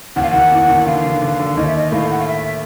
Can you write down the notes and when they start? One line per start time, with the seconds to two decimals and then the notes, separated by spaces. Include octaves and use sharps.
0.16 D#2 D#3 F#5
0.23 F5
0.31 D#2 D#3 F#5
0.52 E2 E3
0.68 D#2 D#3
0.86 D3 F5
1.05 D3
1.22 D3
1.40 D3
1.57 D#2 D#3 D#5
1.67 E5
1.76 D#5
1.92 A2 A3 F5
2.11 F#5
2.20 F5
2.28 E5